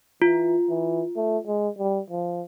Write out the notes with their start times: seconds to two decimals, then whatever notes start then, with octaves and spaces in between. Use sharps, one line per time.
0.22 E3 F4
0.69 E3
1.16 A3
1.47 G#3
1.79 G3
2.10 F3